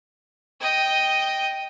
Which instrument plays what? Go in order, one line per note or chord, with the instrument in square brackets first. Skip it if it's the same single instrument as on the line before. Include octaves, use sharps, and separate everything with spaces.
[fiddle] D#5 G5